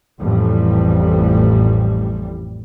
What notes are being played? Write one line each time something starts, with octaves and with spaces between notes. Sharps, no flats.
A1 F2 G3